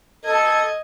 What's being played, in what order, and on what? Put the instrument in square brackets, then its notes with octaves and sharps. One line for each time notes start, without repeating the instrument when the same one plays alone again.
[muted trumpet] A4 [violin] D#5 G#6